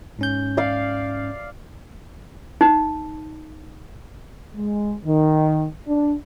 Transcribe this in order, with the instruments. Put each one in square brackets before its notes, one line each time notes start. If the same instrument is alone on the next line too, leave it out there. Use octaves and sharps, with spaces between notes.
[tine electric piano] G#2 C#4 G6
[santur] D5 F5
[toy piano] D#4
[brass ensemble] G#3
D#3
D4